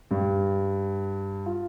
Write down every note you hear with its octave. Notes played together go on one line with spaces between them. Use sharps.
G2
F4